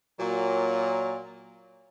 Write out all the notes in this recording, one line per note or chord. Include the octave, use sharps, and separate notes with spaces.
A#2 F#3